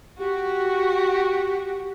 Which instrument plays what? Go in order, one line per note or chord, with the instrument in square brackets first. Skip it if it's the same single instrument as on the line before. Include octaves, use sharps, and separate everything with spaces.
[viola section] F#4 [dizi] G4